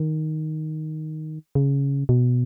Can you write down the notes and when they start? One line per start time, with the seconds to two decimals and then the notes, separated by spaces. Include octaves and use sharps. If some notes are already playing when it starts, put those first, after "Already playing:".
Already playing: D#3
1.55 C#3
2.09 B2